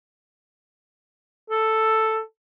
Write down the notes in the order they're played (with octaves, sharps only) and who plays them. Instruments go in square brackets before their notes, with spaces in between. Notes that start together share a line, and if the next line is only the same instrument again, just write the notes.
[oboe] A4